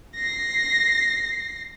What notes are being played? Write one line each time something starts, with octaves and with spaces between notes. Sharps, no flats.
A#6 C7